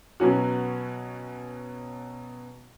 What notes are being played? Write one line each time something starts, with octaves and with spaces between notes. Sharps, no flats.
B2 F#3 C#4 F#4